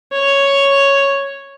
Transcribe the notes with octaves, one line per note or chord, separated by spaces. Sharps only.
C#5